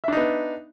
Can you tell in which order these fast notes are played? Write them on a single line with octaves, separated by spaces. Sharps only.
E5 D4 D#4 B3